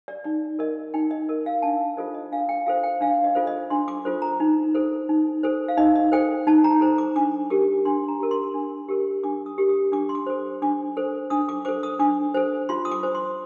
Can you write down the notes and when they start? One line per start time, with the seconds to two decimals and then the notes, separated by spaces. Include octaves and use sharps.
0.08 D5
0.24 D#4 D5
0.59 A#4 D#5
0.94 D#4 G5
1.11 D#5
1.29 A#4 D#5
1.46 F5
1.62 D4 A5
1.97 F4 A4 C5 D#5
2.14 D#5
2.32 D4 F5
2.49 G5
2.66 F4 A4 C5 F5
2.83 G5
3.01 D4 F5
3.24 D#5
3.35 F4 A4 C5
3.47 D#5
3.70 D4 C6
3.88 D6
4.05 F4 A4 C5
4.22 A#5
4.40 D#4
4.74 A4 C5
5.09 D#4
5.43 A4 C5
5.68 F5
5.77 D#4 D#5
5.95 D#5
6.12 A4 C5 G5
6.47 D#4 A5
6.64 A#5
6.81 A4 C5 A#5
6.98 D6
7.16 D4 D6
7.50 G4 A#4 D6
7.85 D4 C6
8.08 A#5
8.19 G4 A#4
8.31 C6
8.54 D4
8.89 G4 A#4
9.23 D4 D6
9.46 D#6
9.58 G4 A#4
9.69 D#6
9.92 D4 D6
10.09 C6
10.15 D6
10.26 A4 C5
10.62 D4 D6
10.97 A4 C5
11.30 D4 D#6
11.49 D6
11.65 A4 C5 D6
11.83 D#6
11.99 D4 D6
12.34 A4 C5
12.69 F4 C6
12.85 D#6
12.91 D6
13.03 C5
13.15 C6